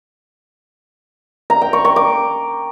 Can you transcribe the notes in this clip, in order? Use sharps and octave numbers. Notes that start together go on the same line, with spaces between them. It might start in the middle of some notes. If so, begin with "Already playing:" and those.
A#5
G5
C#6
C#6
D6